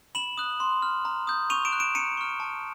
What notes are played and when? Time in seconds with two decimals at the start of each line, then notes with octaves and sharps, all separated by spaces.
0.15 B5 E7 F#7
0.38 D#6 F#6
0.60 C6
0.82 F6
1.05 A#5
1.27 D#6 G6
1.50 C#6 D#7 F7
1.65 D7 E7
1.72 F#6
1.80 D7 E7
1.95 A#5 C#7 D#7
2.17 C#6 F6
2.40 A5